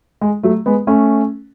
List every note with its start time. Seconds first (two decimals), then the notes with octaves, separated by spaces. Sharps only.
0.21 G#3
0.43 F#3 A3
0.66 G#3 B3
0.87 A3 C#4